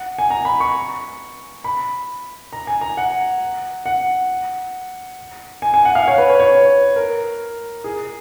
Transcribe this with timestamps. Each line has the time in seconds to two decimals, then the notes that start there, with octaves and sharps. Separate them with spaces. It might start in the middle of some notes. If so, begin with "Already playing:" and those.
Already playing: F#5
0.18 G#5
0.30 A#5
0.45 B5
0.60 C#6
1.64 B5
2.53 A#5
2.67 G#5
2.81 A#5
2.97 F#5
3.86 F#5
5.62 G#5
5.74 G#5
5.85 F#5
5.95 F5
6.08 C#5
6.18 B4
6.30 C#5
6.40 C#5
6.96 A#4
7.84 G#4